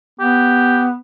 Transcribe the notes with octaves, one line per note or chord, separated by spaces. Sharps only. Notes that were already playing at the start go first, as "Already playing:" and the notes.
B3 G4